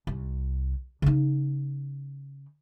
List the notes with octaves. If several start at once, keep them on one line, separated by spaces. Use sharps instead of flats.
C2
C#3 D#4